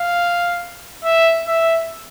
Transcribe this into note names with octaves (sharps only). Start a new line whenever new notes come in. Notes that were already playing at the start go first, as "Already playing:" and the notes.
Already playing: F5
E5
E5